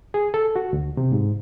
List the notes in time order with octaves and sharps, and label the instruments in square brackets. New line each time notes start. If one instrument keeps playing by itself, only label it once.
[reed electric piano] G#4
A4
F#4
D2
C3
G#2